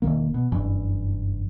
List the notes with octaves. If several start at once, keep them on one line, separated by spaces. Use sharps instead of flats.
E1 F2 D#3 A#3
B2
F#1 G2 E3